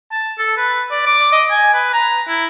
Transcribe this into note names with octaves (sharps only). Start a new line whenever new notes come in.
A5
A4
B4
D5
D6
D#5
G#5
B4
A#5
E4